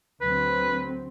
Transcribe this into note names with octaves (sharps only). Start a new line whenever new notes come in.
D2 F#3 C4 B4